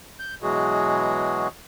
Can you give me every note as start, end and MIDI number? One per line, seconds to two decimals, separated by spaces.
0.19 0.35 91
0.42 1.48 47
0.42 1.48 52
0.42 1.48 54
0.42 1.48 56
0.42 1.48 66
0.42 1.48 68